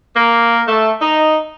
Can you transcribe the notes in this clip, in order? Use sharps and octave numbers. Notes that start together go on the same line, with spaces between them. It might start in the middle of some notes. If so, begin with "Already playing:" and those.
A#3
A3
D#4